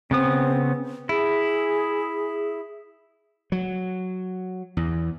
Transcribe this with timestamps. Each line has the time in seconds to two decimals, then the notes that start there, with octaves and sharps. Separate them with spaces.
0.11 C#3 B3 C4 D#6
1.09 E4 G#4
3.52 F#3
4.77 E2